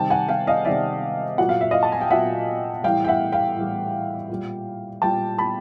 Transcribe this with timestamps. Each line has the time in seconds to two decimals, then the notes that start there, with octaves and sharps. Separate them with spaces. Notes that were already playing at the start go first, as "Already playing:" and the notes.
Already playing: C3 D#3 G3 G5 A5
0.10 F#5 G#5
0.29 F5 G5
0.47 D#5 F5
0.65 C3 D#3 G3 D5 E5
1.38 A#2 F#3 F#5
1.49 F5
1.61 E5
1.71 D#5 F5
1.83 A5
1.92 G#5
2.01 G5
2.10 A#2 F#3 E5 F#5
2.83 A2 E3 G3 F5 G5
3.05 G5
3.08 E5 F#5
3.32 F5 G5
3.56 A2 E3 G3
4.29 A#2 G3
5.02 A#2 G3 G5 A5
5.38 A5 B5